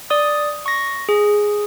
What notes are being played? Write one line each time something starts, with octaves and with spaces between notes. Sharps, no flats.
D5 D#6
C#6 A#6
G#4